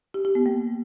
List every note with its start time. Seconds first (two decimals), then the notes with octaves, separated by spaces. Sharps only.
0.14 G4
0.25 G4
0.35 B3
0.46 A#3